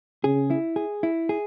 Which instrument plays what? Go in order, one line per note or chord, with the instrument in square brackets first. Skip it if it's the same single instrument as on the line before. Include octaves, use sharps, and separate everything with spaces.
[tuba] C#3 [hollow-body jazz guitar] G#4
[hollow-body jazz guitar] E4
G#4
E4
G#4